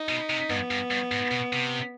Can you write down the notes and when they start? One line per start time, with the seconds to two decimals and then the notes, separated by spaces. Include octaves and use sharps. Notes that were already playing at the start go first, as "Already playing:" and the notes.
Already playing: D#4
0.09 B2
0.30 C3
0.50 G2 B3
0.71 G2
0.91 G2
1.12 G#2
1.31 B2
1.53 C3